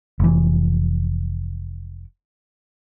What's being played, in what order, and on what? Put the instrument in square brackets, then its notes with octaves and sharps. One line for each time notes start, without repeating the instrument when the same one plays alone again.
[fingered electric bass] F1 E3